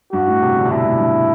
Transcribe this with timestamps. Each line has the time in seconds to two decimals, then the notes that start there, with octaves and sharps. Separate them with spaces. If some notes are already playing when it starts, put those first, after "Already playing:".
0.13 G2 F#4
0.27 A2
0.42 C3
0.57 D3
0.65 C3
0.70 B2 E4
0.86 A2
0.99 G2